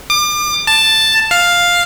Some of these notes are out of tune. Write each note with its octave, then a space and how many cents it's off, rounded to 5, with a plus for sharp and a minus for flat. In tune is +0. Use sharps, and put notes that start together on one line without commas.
D6 +35
A5 +5
F5 +5